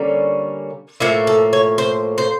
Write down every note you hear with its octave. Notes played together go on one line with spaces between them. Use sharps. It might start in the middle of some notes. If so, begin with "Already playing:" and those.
Already playing: D3 G3 A#3 C#4
A2 F3 A#3 E4
A4
C#5
C5
C5